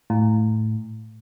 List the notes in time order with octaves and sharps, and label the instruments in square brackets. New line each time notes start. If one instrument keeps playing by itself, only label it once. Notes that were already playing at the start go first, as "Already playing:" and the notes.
[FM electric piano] A2